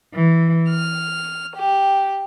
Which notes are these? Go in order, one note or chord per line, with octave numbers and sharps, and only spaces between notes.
E3
F6
G4